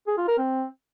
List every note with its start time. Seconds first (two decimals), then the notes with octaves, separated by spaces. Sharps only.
0.07 G#4
0.17 F4
0.28 A#4
0.38 C4